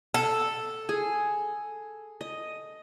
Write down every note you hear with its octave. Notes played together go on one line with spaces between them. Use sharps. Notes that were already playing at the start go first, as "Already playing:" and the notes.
A4
G#4
D#5